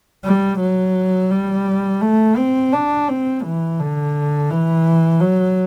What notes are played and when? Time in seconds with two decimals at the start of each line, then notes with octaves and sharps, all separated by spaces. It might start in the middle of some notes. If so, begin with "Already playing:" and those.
0.25 G3
0.60 F#3
1.31 G3
2.01 A3
2.37 C4
2.73 D4
3.08 C4
3.43 E3
3.79 D3
4.50 E3
5.20 F#3